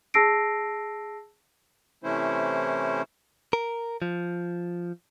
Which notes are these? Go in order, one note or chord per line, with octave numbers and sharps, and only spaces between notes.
G#4 A5 E6 A#6 C7 D7
C3 E3 A3 C#4 E4 C5
A#4
F3